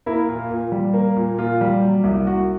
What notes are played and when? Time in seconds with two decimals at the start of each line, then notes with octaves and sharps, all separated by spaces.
0.06 A#3 E4
0.29 A#2 F4
0.51 A#2
0.72 G3
0.94 A#3
1.16 A#2
1.39 A#2 F4
1.61 G3
1.83 F#3
2.04 C2
2.27 C2 F#4